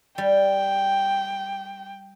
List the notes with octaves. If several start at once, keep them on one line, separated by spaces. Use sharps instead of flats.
G3 G5